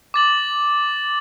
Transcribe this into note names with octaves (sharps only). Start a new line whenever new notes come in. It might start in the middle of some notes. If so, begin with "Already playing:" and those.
D6 A6 F#7